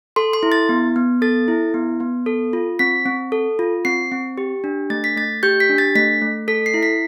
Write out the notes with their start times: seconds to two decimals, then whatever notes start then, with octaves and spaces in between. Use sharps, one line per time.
0.16 A4 C6
0.33 C6
0.43 E4
0.52 A6
0.69 B3
0.96 B3
1.22 A4 A6
1.48 E4
1.74 B3
2.00 B3
2.26 A4
2.53 F4
2.79 C4 B6
3.06 C4
3.32 A4
3.59 F4
3.85 C4 C7
4.12 C4
4.38 G4
4.64 D4
4.90 A3 A6
5.04 B6
5.16 A3 A6
5.43 G4 G6
5.60 B6
5.69 D4
5.78 A6
5.95 A3 B6
6.22 A3
6.48 A4 B6
6.66 C7
6.74 E4
6.83 B6